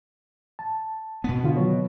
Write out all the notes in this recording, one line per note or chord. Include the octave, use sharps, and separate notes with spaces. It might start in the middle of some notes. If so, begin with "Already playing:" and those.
A5
B2 B3
D3 F4
D#3 F#3 C#5